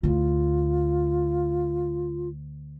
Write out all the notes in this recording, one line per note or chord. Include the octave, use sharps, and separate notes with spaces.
D2 E4 F4